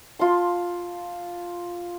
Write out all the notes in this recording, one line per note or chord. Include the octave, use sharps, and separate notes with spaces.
F4 A5 C6